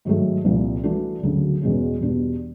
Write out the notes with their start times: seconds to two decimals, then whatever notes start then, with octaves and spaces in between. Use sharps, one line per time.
0.05 G#2 D#3 F#3 A3
0.44 C2 A#2 F3
0.83 E3 A3 D4 F#4 A4
1.23 D2 C#3 F#3
1.61 E2 B2 G#3 C#4
2.01 E2 B2 G3 B3 D4